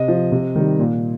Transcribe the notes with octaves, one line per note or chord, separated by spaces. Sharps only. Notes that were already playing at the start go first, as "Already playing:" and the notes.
Already playing: C3 D#5
F3
C3
D#3 G3
A#2